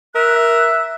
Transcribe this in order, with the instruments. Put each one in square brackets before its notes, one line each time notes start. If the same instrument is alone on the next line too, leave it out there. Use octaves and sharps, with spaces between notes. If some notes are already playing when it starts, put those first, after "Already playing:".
[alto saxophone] A#4 [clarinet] E5 [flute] F#6